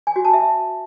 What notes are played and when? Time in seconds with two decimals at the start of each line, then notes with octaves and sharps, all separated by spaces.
0.07 G#5
0.16 F#4
0.25 A5
0.33 E5